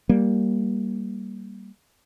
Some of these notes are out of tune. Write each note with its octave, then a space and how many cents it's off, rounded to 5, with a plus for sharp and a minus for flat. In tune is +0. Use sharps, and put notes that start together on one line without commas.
G3 +0 A#3 +5